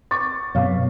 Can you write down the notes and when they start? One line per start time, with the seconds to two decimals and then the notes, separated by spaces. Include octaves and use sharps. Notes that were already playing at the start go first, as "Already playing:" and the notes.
0.11 C#6 D6 A6
0.55 F#2 B2 C#5 F5